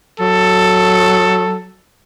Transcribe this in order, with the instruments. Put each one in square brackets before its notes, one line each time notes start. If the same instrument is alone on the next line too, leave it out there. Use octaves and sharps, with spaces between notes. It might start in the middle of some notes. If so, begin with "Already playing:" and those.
[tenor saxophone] F#3 [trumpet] A4